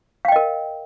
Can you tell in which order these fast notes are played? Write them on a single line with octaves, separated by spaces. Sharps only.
F5 G5 D#5 A#4